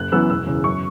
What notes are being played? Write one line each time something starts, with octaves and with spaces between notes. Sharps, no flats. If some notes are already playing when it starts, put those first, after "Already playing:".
Already playing: F#1 F#6
F#2 E3 B3 E6
E1 E6
E2 C#3
F#2 C#6